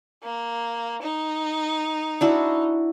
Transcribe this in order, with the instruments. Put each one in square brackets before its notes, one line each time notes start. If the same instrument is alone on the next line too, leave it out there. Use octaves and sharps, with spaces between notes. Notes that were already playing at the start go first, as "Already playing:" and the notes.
[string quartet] A#3
D#4
[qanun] D4 E4 F#4